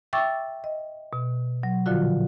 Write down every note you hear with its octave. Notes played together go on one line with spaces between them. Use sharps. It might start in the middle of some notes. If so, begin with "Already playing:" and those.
E5 G5 C#6 D6 E6 A6
D#5
B2
F#3
A#2 D3 F3 F4 F#4